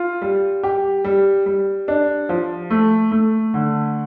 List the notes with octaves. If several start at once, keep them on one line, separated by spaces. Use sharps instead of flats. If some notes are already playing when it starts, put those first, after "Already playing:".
Already playing: F4
G3
G4
G3
G3
D4
F3
A3
A3
D3